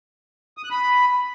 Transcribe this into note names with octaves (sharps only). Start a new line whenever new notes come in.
D#6
F#6
B5